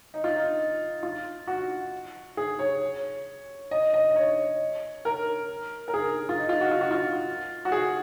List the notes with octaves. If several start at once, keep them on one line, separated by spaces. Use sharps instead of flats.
D#4
F4
D#4
F4
F#4
G#4
C#5
D#5
D#5
D#5
C#5
A#4
A#4
G#4
F4
D#4
F4
F#4
F4
F#4
F4
F#4
G#4